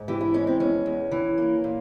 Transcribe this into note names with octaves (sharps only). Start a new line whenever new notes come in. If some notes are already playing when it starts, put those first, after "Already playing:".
Already playing: G#2
E3 G4
E4
G#3 C#4
C4
E2 C#4
E2
E3
A#3
A#2